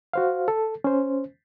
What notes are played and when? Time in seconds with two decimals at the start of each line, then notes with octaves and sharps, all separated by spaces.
0.13 F#4 C5 F5
0.48 A4
0.84 C#4 C5